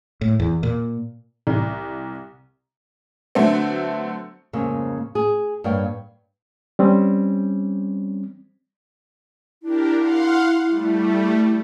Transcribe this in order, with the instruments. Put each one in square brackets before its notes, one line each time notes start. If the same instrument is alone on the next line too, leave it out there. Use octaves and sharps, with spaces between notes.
[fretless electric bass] A2
E2
A#2
[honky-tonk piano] C2
D3 F#3 A3 B3 C4
[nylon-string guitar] F2 G#2 C#3 A#3
G#4
G2 A#3 C#5 F5 G5
[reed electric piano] G3 C4 C#4
[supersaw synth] D4 G4 A#4 [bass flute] E4
[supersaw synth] F5 F#5 C6
G3 A3